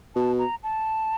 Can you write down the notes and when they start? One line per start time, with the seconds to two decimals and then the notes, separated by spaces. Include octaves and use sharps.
0.15 B2 A5
0.38 A#5
0.63 A5